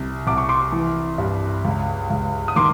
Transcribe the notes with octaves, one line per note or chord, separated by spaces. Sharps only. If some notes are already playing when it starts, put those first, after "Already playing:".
Already playing: C2
C2 D6
C#6
C6 D6
E3
G2
C#2
C#2
D#6
D#3 C6 D6